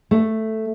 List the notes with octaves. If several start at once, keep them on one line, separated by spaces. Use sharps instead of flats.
A3